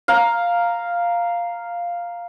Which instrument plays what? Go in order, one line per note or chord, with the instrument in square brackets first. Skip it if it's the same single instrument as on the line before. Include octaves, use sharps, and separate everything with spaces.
[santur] F5 A#5